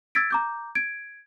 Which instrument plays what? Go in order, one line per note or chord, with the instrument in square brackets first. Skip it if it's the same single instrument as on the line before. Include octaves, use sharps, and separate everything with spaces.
[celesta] E6 G#6 A6 B6 D7
A#5 D6 G6
G#6 D7